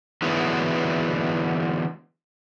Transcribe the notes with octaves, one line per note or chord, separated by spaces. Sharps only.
D3 E3 F#3 G#3 B3